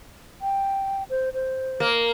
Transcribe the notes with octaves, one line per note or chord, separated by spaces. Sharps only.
G5
C5
C5
A#3